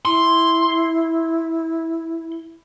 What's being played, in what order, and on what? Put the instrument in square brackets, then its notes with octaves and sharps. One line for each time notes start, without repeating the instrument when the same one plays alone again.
[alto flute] E4 [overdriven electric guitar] C6